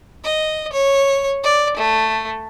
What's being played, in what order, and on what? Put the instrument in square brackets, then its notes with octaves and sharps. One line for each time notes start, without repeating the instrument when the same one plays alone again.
[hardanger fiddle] D#5
C#5
D5
A3